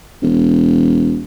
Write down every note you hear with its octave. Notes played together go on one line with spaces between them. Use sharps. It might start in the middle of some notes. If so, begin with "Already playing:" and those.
E1